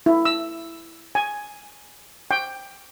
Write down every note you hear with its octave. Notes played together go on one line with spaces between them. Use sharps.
E4
E6
G#5
G5